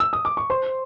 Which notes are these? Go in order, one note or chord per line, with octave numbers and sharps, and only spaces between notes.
E6
D#6
D6
C#6
C5 C6